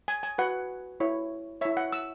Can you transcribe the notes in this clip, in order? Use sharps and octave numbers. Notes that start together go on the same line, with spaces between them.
G#5
G#5
F#4 B4 F#5
E4 C#5
E4 C#5 E5
F#5
E6